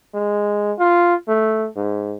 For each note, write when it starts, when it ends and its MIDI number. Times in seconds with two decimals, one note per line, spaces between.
0.14 0.72 56
0.79 1.15 65
1.28 1.68 57
1.77 2.17 44